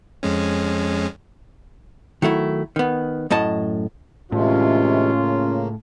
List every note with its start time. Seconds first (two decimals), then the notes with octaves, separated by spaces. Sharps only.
0.23 F2 G#3 C#4
2.22 D#3 F#3 A3 E4
2.76 D#3 B3
3.30 F#2 A2 D#5 A5
4.32 A2 C3 E3 G#3 C#4 F4
5.16 C#3 A#3